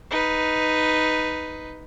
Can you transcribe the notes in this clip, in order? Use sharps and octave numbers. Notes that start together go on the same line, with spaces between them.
D#4 B4